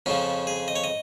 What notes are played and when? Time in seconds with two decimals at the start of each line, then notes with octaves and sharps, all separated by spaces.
0.06 F2 C#3 F3 C#4
0.47 G#4
0.68 D#5
0.76 C#5
0.84 D#5